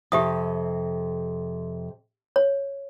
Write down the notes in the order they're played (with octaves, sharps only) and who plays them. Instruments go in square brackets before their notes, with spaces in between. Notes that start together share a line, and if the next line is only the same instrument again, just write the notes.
[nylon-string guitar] F2 C3 [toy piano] G4 E5 D#6
[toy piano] C#5